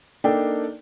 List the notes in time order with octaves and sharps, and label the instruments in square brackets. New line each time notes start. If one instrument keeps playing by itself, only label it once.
[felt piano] A#3 D4 D#4 A4 G5